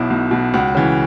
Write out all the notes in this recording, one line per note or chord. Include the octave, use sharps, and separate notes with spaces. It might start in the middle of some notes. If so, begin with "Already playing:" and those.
Already playing: B1 B2 E4
B1
B2
C#2 F#4
C#3 E3